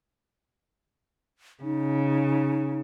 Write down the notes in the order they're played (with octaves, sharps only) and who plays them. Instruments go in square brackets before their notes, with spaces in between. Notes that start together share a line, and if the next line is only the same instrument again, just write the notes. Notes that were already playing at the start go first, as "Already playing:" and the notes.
[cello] C#3 [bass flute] D#4